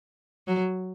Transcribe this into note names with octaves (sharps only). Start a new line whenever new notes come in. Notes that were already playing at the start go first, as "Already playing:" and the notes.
F#3